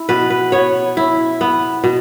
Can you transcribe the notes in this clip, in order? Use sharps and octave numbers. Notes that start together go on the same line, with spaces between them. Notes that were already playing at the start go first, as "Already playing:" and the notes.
Already playing: E4
B2 B4
B4
B3 C#5
E4
B3
B2